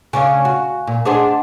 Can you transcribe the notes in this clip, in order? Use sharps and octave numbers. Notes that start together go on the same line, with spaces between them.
C#3 C#4 D4 F5 G#5
F#4
A#2
D4 G#4 C5 D#5 F#5 A5